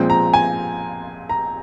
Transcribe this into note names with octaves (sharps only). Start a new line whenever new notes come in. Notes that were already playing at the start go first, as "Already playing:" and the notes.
Already playing: A#2 F3 G#3 C4
A#5
G#5
A#5